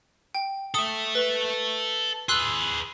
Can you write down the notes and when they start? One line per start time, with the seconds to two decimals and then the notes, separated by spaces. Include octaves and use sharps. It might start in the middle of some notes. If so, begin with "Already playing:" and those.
0.35 G5
0.74 A4 E5 D#6
1.15 B4
2.29 G#4 B4 C6 E6 F#6